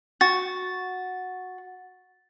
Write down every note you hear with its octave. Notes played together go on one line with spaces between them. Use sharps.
F#4 A6